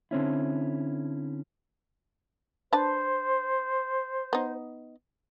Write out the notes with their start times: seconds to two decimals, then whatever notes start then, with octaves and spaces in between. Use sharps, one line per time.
0.11 D3 C4 C#4 E4
2.73 D4 B4 C5 A5
4.33 B3 D#4